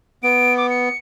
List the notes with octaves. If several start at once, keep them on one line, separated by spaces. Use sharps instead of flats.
B3 D7
D6
C#7